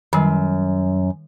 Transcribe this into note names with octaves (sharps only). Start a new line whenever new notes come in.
F#2 D#3 G3